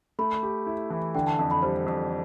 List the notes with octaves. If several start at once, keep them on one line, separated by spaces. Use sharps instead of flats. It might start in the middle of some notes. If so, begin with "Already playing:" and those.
A3 B5
G4
E4
E3
D3 G5
A5
F2 A5
B5
G3 C5
F2